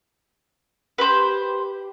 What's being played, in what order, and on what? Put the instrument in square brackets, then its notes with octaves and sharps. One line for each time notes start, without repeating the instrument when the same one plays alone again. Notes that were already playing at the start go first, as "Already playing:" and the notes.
[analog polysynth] G4 [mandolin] B4 C5